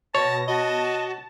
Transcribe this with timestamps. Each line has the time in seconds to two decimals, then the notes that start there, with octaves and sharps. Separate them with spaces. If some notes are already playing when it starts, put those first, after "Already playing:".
0.15 B2 C#5 A5 A#6
0.48 F#4 D#5 A5